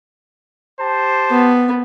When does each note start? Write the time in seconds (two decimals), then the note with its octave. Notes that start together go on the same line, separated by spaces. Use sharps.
0.80 G4 C5 A5
1.30 B3